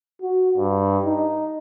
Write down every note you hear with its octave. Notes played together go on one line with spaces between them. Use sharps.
F#4
G2
D#4